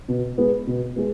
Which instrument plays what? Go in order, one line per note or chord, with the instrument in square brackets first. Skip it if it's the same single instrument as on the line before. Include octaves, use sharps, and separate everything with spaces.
[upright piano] B2
G#3 B3
B2
G#3 B3